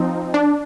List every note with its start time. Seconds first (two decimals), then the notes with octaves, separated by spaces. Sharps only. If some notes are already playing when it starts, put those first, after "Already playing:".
Already playing: F3 C4 D#4
0.34 D4